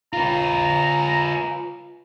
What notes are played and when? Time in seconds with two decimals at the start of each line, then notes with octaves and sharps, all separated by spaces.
0.13 F4 B4 A#5